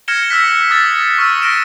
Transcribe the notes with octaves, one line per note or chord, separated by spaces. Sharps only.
F6 G#6 A#6 C#7 E7 G7
E6 F#6 B6
D#6 E6 A6
C#6 E6 F6
F6 A#6 D7 E7